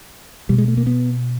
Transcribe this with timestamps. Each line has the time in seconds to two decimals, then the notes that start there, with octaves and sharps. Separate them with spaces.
0.49 B2 G3
0.58 G#3
0.68 A3
0.77 A#3
0.86 B3